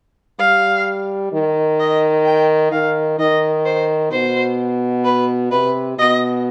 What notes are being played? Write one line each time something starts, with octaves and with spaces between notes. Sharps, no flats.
G3 F5
D#3
D#5
G5
D#3 F5
D#3 D#5
C5
B2 C5
B4
C3 B4
B2 D#5